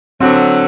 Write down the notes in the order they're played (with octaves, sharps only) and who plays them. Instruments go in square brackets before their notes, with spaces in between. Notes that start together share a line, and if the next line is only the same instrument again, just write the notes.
[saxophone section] D3 F#3 [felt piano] C4